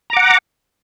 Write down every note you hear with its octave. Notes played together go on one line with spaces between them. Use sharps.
F#5 A#5 D6